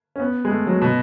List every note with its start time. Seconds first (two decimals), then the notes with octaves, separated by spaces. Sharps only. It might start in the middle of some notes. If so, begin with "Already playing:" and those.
0.16 C#4
0.20 B3
0.45 G#3
0.51 A3
0.67 F#3
0.82 B2